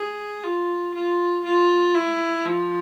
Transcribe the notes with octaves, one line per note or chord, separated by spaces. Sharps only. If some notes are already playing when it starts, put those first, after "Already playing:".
Already playing: G#4
F4
F4
F4
E4
F3